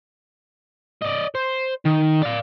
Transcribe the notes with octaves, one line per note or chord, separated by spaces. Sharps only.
D5 D#5
C5
D#3
D5 F5